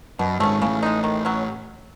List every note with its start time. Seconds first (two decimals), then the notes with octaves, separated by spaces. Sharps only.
0.19 F#2 B2
0.40 G#1 G#2 A3 C#4
0.61 A1 A2 C#3
0.82 G#3 D#4
1.04 D#3
1.25 F#3 C#4